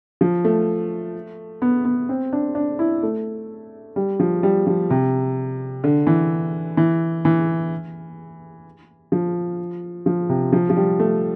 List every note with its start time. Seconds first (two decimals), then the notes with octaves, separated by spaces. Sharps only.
0.21 F3
0.44 A3
1.62 B3
1.85 B3
2.09 C4
2.33 D4
2.55 D4
2.79 E4
3.03 A3
3.96 G3
4.20 F3
4.43 G3
4.67 F3
4.90 C3
5.84 D3
6.07 E3
6.77 E3
7.25 E3
9.12 F3
10.06 F3
10.29 C3
10.52 F3
10.70 F3
10.77 G3
11.00 A3